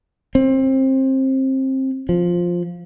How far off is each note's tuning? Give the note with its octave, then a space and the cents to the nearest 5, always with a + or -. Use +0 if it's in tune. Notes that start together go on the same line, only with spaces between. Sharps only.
C4 +25
F3 +5